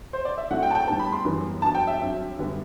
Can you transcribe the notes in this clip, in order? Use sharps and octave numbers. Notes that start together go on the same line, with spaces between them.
C5
D5
E5
A2 F#3 A3 C4 F#5
G5
A5
G5
A2 G3 B3 A5
B5
C6
F#2 E3 G3 B3
G2 F#3 B3 A5
G5
E5
G2 F#3 C4
F#2 D3 G3 B3